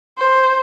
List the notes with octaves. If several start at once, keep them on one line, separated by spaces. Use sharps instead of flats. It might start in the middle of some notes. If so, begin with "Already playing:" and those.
C5